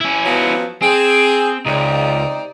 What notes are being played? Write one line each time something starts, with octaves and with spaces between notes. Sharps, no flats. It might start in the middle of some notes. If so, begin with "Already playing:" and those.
C#4 E4
F3 F#3 B3
C4 G#4
C#2 C3 D#4 D5